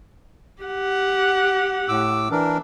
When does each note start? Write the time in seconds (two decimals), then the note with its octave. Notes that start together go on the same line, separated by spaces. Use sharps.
0.63 G4 F#5
1.88 A2 D6 E6
2.31 E3 D4 A#4